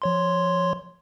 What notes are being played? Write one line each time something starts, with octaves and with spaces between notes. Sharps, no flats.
F3 C#5 C6